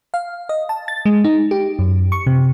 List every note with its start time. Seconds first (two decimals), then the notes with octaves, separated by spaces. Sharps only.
0.14 F5
0.49 D#5
0.69 A5
0.88 A6
1.05 G#3
1.24 D#4
1.51 G4
1.79 F#2
2.12 C#6
2.27 C3